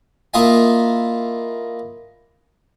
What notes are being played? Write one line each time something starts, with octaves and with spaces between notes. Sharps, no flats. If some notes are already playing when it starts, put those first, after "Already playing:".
A#3 E4 F4 D#5 E5 G#5